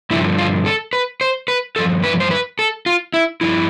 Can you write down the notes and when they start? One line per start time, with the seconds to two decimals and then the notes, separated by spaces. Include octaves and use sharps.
0.10 G2 D3 F3 E4
0.38 F4
0.66 A4
0.93 B4
1.21 C5
1.48 B4
1.76 G2 F3 A4
2.04 B4
2.20 C5
2.31 B4
2.59 A4
2.86 F4
3.14 E4
3.41 G2 F3 E4